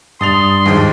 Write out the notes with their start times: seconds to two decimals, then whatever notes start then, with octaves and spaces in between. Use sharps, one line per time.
0.21 G2 C6 D#6 A6 F7
0.66 D#2 G#2 F3